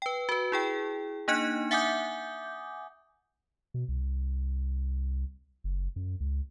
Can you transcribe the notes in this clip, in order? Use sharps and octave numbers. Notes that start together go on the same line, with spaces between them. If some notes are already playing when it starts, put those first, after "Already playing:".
B4 G5
F#4 B4
E4 G#4 G5
A#3 D4 D#4 D#5 F#6 C#7
E5 F#5 G#5 D6 D#6 G6
B2
C2
F#1
F#2
C#2